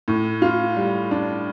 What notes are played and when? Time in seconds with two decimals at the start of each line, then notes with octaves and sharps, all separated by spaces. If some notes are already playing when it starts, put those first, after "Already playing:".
0.08 A2
0.42 F4
0.76 G3
1.11 D4